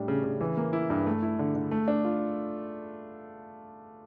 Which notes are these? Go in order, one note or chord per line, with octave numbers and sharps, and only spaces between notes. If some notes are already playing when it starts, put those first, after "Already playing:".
Already playing: A2 G3 D4
C#3
C#3
E3
A#3
E4
G2
A3
E4
D3
D3
A3
D4
F4